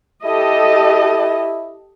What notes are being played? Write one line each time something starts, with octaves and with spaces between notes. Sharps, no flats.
E4 G4 A4 D#5